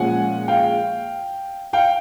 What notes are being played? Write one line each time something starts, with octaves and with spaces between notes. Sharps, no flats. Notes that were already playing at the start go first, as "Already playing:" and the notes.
Already playing: A#2 F3 G#3 C#4 F#5 G#5
F5 G5
F5 G5